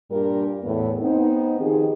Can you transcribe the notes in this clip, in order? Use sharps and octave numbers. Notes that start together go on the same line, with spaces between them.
G2 A#2 G3 D4 G4 A#4
E2 A2 B3
B3 C4 D#4
D#3 F3 G4 G#4